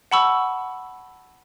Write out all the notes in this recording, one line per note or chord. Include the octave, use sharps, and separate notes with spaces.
F#5 A5 B5 C#6 E6